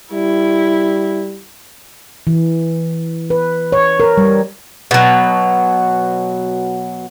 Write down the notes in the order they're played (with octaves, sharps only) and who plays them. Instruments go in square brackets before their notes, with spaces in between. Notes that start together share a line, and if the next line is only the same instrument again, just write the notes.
[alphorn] G3 [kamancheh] E4
[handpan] E3
B4
C#5
A#4
G3
[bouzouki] B2 F#3